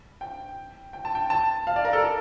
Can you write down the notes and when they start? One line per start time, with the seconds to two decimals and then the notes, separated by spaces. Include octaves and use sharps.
0.21 G5
0.93 G5
1.05 A5
1.15 G5
1.30 A5
1.67 F5
1.76 D5
1.85 A#4
1.93 A4
2.03 A4